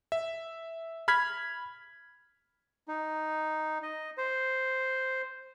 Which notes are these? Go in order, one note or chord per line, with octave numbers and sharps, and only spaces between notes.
E5
B5 F6 G#6 B6
D#4
D#5
C5